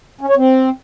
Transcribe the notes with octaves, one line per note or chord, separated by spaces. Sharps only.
C#4
C#5
C4